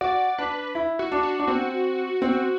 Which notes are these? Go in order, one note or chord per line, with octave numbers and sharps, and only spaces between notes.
F#4 D5
D4 B4
E4
F#4
D4
F#4
D4
C4 F#4
C4